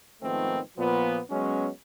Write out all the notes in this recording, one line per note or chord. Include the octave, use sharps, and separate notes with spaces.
G#2 D#3 F3 A3 B3 C4
A#2 F3 B3
F#3 G#3 B3 C#4